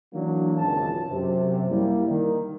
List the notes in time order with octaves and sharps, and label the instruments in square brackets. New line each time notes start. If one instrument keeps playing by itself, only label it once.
[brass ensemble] E3 F#3 A#3 D4
G#1 C#2 D#3 A5
F#2 C3
G3 A#3 E4
D#3